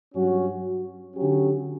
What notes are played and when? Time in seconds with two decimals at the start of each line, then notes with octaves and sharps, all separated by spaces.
0.14 G2 F#3 C#4 F#4
1.14 D3 F#3 C#4 G4